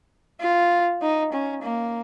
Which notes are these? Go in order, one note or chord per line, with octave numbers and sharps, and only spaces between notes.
F4
D#4
C#4
A#3